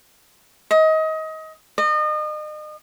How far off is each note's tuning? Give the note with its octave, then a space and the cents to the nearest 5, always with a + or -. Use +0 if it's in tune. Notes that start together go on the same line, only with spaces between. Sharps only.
D#5 +25
D#5 -35